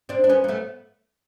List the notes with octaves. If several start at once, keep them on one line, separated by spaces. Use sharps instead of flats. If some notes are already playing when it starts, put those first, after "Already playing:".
C4 D4
D4
B3 C#4
A#3
A3 B3